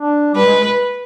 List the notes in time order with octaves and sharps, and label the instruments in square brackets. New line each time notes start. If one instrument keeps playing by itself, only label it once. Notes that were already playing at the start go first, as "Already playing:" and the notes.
Already playing: [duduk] D4
[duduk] G3 [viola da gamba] B4
[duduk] G#3